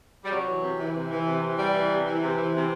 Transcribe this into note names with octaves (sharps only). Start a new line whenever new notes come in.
G3
C3 F#3
E3
C3
E3
C3
E3
C3
E3
C3 G3
E3
C3
E3
C3
E3
C3